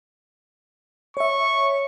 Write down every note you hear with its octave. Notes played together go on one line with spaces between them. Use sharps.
C#5 E5 C#6